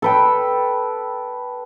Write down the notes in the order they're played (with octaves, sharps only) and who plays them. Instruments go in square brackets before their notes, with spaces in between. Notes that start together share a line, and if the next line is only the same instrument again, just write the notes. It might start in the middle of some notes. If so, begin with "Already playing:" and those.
[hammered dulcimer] A4 B4 G5